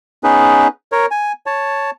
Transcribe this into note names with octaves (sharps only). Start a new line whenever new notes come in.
B3 C#4 D#4 G#4 B4
A#4 C#5
G#5
C#5 A5